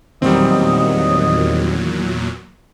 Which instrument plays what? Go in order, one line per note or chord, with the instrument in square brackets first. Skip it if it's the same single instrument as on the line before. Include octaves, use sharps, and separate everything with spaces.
[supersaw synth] E2 A#2 F#3 [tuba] D#3 [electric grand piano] G3 C4 [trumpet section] D#5